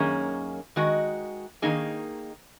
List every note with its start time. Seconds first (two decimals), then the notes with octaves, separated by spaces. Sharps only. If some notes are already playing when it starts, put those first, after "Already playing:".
Already playing: F#2 D#3 A#3 C#4 G#4
0.76 D#3 G#3 F#4 D#5
1.62 D#3 A#3 D#4 G#4